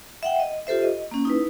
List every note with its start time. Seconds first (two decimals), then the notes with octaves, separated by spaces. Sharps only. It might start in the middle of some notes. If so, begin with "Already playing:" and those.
0.23 E5 F#5 G5
0.40 D#5
0.67 F4 G4 A4 C5 E5
0.82 D#5
1.11 A#3 C#4
1.25 D#4 E4 B4